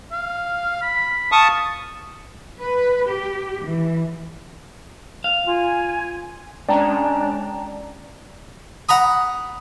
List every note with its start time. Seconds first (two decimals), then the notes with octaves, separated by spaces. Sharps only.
0.12 F5
0.82 B5
1.32 F5 A5 C#6 D#6
2.61 B4
3.06 G4
3.62 E3
5.24 F5
5.47 F4 G#5
6.69 G#3 C#4 D4 D5 G5 A5 A#5
8.89 F#5 A#5 B5 D#6